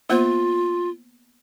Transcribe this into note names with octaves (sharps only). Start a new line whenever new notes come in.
A#3 B3 F4 C5